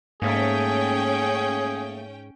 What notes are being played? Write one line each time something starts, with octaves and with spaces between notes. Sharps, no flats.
G#2 A3 A#3 C#4 G#4 G5